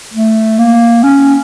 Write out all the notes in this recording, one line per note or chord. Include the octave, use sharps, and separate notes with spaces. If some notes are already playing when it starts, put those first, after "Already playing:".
A3
A#3
C#4